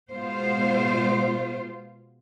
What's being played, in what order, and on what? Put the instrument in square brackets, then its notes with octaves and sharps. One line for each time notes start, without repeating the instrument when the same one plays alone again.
[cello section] B2 G#3 B3 F4 C5